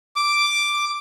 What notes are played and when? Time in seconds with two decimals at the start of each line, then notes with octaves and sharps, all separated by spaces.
0.16 D6